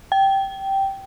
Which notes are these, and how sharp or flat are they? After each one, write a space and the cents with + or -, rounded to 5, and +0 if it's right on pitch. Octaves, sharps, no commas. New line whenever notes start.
G5 -10